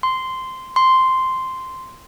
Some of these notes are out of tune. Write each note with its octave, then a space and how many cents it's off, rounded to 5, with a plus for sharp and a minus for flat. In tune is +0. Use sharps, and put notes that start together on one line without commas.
C6 -10
C6 -5